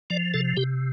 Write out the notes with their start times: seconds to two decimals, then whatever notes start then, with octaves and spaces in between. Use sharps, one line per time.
0.10 F3 D5
0.34 C3 A4
0.57 C3 G4